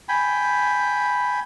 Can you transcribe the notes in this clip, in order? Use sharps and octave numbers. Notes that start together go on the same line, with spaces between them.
G5 G#5 B5